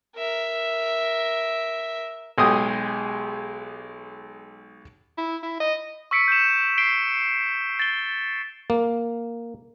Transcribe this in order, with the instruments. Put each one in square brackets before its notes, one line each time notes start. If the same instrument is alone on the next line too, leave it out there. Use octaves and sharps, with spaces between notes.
[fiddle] A#4 E5
[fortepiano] B1 G#3 G4 G#4 D#6
[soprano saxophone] E4
E4
D#5
[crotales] C#6 E6 B6 C#7 D7
G6 E7
B6 C7 D7 G7
A6 G7
[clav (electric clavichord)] A#3